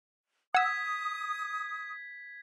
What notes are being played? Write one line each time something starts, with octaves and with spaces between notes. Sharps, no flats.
F#5 D#6 E6 G#6 B6